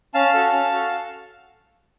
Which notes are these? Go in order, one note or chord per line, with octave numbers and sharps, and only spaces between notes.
C#4 F5 A5
F#4 A4
C#4
F#4 A4